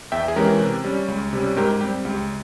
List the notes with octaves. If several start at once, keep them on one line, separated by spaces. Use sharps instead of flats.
E2 E5 G5
G#4
E3 G#3 C#4 G4 A#4
C3
G3 C#4
C#2
C3 G3 C#4
G#2 G4 A#4
G3 C4 G4
C#2 G4